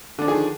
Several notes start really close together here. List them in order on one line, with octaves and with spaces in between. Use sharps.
D3 D4 F3 G#4 D#3